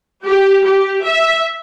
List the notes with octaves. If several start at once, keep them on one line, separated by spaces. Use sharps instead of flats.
G4
G4
E5